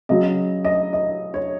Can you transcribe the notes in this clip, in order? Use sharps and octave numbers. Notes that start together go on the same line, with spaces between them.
C#3 F#3 D#5
D#5
D#5
C#5